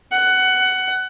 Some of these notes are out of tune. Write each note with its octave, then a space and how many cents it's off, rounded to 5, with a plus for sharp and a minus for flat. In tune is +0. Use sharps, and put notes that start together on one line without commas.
F#5 +15